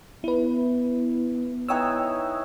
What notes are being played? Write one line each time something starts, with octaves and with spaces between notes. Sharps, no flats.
B3 E4 B4
E3 D#4 C#5 G5 D#6 E6